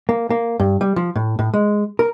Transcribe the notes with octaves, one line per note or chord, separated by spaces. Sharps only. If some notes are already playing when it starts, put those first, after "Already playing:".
A#3
A#3
G2
G3
F3
A2
A2
G#3
A#4